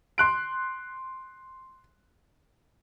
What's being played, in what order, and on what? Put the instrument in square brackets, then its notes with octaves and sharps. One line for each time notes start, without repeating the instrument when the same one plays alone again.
[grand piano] C6 F#6 D7